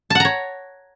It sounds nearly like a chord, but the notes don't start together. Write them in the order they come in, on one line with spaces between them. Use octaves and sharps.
A5 F#5 A#5 C#5